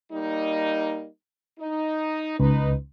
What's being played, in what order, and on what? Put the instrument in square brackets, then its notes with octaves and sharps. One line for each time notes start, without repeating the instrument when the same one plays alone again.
[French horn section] G3 A#3 D#4
D#4
[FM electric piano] C#2 [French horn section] D#4 B4